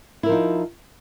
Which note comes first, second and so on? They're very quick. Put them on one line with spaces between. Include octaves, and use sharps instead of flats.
E4 A#4 F3 D#4